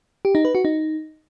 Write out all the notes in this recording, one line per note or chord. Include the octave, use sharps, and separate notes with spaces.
G4
D#4
B4
F#4
D#4